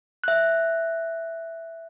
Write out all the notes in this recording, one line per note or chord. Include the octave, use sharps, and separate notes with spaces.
E5 F#6